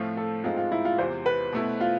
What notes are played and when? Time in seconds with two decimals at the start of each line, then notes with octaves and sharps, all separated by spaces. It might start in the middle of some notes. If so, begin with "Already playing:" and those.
Already playing: A2 F3 A3 C4 F4
0.17 A4
0.44 G#2 G#3 C4 F4
0.57 F4
0.72 E4
0.85 F4
0.98 E2 C3 E3 C5
1.26 B4
1.52 B2 A3 E4
1.81 F4